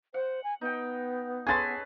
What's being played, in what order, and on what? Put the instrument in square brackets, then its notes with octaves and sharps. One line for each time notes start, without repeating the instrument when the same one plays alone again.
[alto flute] C5 [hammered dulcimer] F#5
[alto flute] G#5
[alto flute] B3 [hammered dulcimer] D#4 G5
[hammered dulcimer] C#4 B4 G#5 [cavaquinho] G#4 A4 C6 [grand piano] G#6 A6